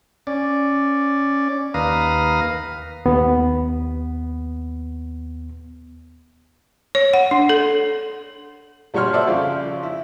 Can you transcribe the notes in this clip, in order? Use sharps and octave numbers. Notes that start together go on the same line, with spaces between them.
C#4 D5
D#2 B4 F5 A#5 D#6
D#2 B3
C#5
F#5
D4
A4
A#1 G3 F#4 C#5 C6 F6
A4 C5 D5 E5
F2 C#3
E4